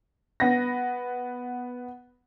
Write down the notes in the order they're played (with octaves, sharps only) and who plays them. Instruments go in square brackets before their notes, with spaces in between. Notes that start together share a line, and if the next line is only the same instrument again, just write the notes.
[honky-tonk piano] B3 A#6